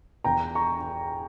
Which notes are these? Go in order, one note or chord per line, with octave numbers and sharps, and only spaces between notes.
E2 G5 A#5
A#5 C#6